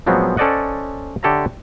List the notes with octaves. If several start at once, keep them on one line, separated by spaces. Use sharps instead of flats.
A#2 F3 F#3 G#3 B3 C4
C#4 A4 C5 D5 D#5 F#5
D3 G4 A4 C#5 E5 A#5